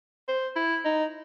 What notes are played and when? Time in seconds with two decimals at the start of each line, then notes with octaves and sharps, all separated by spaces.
0.28 C5
0.56 E4
0.85 D#4